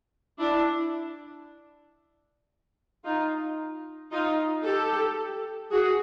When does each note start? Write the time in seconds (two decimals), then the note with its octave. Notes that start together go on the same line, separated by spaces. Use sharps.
0.40 D4 E4
3.05 D#4 F4
4.12 D#4 F4
4.65 G4 A4
5.71 F#4 G#4